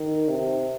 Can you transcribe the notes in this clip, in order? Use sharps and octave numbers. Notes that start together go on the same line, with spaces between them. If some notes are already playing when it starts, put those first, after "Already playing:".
Already playing: D#3
C3